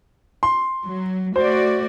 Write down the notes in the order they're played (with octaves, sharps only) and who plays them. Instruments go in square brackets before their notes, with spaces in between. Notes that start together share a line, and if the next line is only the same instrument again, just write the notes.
[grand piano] C6
[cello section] F#3
[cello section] A3 F#4 D5 [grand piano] C5